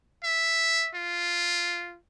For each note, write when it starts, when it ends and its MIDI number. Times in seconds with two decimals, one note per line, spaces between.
0.24 0.90 76
0.95 1.98 65